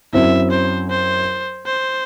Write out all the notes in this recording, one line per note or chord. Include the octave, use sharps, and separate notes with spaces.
F#2 F#3 C4 E4 E5
C5
C5
C5